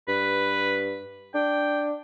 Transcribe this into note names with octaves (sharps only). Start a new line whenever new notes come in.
G2 B4
D4 G5